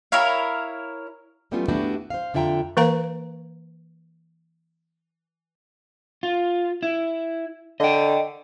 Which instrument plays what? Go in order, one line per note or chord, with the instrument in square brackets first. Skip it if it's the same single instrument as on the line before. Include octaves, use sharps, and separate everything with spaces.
[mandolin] E4 A#4 C#5 F5
[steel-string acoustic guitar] F#3 G3 A3 B3 C#4 F4
A3 B3 D4 E4 F#4 G4
C5 F5
F2 D3 F4 E5 G5 A#5
[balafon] E3 A#3 A#4 B4 F5 A#5
[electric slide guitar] F4
E4
[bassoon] D3 [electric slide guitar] D#5 G5